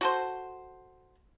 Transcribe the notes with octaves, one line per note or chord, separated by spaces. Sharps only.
F#4 A4 C5